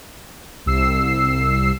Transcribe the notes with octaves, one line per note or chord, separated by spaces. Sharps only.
C2 E6 C7